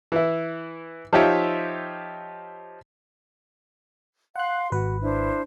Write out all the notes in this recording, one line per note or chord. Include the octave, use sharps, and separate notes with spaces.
E3 E4
F3 D#4 F4 G4 C#5 E5
F5 F#5 C6 F#6
G#1 F#4 B4
D4 E4 C5